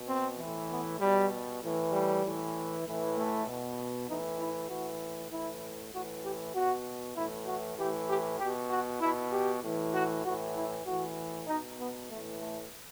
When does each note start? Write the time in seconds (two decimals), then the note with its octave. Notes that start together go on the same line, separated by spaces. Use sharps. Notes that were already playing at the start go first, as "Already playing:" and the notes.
Already playing: B2
0.08 C4
0.38 A2 E3
0.70 B3
1.00 B2 G3
1.62 A2 E3
1.93 G3
2.24 A2 E3
2.85 A2 E3
3.17 A3
3.47 B2
4.08 A2 E3 D#4
4.40 E4
4.70 A2 E3 F#4
5.32 A2 E3 E4
5.93 A2 E3 F#4
6.24 G4
6.55 B2 F#4
7.16 A2 E3 E4
7.47 F#4
7.78 A2 E3 G4
8.09 G4
8.39 B2 G4
8.71 F#4
9.01 B2 E4
9.33 G4
9.63 A2 E3
9.94 F#4
10.24 A2 E3 F#4
10.56 E4
10.86 A2 E3 F#4
11.47 B2 D#4
11.79 B3
12.09 A2 E3 A3
12.40 A3